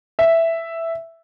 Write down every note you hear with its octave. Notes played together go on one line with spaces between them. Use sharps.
E5